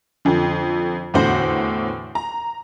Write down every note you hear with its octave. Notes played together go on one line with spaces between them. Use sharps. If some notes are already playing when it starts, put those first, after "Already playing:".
F2 D3
E2 A2 D3 F#4 C5 F#5
A#5